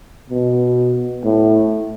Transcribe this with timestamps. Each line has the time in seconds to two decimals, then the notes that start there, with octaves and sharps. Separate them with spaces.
0.30 B2
1.25 A2